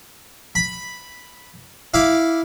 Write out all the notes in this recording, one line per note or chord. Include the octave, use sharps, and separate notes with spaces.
B5
E4 F5 D6